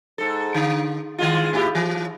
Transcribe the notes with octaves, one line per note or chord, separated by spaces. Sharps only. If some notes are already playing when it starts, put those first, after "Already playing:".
G#2 A4
D3
D#3 G#3 F4
A2 E4 G4
E3